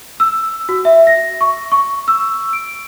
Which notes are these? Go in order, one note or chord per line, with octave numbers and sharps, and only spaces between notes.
E6
F#4
E5
A#6
C#6
C#6
E6
D7